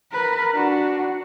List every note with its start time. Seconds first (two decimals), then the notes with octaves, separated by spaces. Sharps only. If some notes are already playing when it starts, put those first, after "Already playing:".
0.12 A#4 B4
0.54 D4 F#4